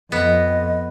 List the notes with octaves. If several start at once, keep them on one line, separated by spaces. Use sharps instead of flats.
F2 B3 D#5